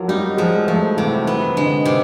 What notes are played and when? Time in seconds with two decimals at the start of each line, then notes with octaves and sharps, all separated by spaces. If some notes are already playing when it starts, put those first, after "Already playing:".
Already playing: F3 F#3 A#3
0.08 G3 D#4
0.37 F3 G#3
0.68 F3 A3
0.97 C3 E3
1.27 D#3 B3
1.56 D3 G#3
1.85 C3 D#3